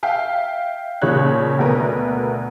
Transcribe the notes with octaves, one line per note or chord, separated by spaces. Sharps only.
E5 F5 G5
D#2 A#2 C#3 C#5 F#6
D2 B2 A#4 B4